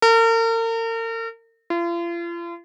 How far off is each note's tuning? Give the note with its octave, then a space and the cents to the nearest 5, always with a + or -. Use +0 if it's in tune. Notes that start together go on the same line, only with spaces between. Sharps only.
A#4 -40
F4 -40